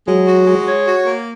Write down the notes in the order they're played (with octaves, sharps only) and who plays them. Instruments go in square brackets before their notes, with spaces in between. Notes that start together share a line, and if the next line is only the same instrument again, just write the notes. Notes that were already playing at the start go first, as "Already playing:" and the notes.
[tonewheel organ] F#3 [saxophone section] G#3
[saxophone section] F#4
G#3
C#5
F#4
A#3